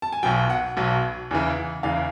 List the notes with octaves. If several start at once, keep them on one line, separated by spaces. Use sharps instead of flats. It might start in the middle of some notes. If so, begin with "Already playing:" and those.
A5
G#5
B1 B2 F#3 G5
F#5
B1 B2 F#3
E2 C#3 E3
E2 C#3 E3 F5